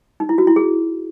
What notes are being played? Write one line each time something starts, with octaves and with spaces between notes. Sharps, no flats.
D#4
E4
F#4
E4
G#4